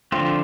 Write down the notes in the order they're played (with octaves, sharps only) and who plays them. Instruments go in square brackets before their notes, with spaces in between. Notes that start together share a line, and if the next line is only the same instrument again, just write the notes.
[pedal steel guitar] D3 F3 A3 C4 F4